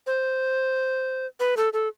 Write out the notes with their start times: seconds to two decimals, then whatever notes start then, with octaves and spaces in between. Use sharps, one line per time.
0.07 C5
1.40 B4
1.57 A4
1.73 A4